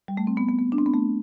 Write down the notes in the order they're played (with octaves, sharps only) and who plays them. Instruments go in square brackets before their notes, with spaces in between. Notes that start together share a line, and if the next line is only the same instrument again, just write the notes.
[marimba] G3
A3
C4
B3
B3
B3
D4
C4
B3
A3